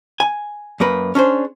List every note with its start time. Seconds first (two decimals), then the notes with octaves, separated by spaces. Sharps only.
0.20 G#5
0.80 F#2 A#3 A#4 B4
1.15 C#4 D4 G#4 C5